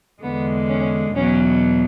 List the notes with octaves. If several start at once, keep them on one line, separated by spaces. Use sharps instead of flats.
E2 D3 G#3 B3
C#4
E2 B2 F#3 C#4